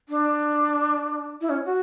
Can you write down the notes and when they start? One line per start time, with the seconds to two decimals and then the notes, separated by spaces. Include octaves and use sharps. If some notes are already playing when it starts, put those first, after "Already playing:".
0.09 D4
1.41 E4
1.50 C#4
1.66 F#4